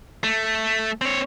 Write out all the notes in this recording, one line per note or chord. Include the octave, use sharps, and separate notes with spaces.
A3
C4 C#5